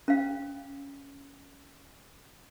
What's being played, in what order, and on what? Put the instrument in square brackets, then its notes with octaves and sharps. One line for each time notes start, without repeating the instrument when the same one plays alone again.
[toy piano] C#4 F5